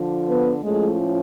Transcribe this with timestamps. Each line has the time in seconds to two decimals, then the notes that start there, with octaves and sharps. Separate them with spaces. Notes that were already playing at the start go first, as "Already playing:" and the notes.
Already playing: D3 F3
0.26 B3 B4
0.63 A2 F3 G#3 A3 C#4 G#4